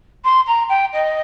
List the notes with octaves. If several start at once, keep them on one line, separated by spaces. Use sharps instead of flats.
C6
A#5
G5
D#5